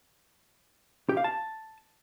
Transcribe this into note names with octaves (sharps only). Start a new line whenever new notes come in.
G4
F5
A5